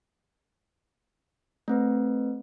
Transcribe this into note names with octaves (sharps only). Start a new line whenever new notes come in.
A3 C4 B4